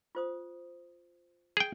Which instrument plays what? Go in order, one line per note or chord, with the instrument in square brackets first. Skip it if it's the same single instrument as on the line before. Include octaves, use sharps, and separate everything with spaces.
[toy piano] F4 C5 D#6
[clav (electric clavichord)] G#4 G5